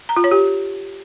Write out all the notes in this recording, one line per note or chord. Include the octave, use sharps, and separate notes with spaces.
A#5
F4
C#5
G4